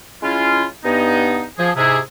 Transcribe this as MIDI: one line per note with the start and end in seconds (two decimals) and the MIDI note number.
0.23 0.65 49
0.23 0.65 56
0.23 0.65 61
0.23 0.65 64
0.23 0.65 65
0.84 1.43 43
0.84 1.43 59
0.84 1.43 63
1.58 1.70 53
1.58 1.70 68
1.76 1.99 44
1.76 1.99 48
1.76 1.99 64
1.76 1.99 68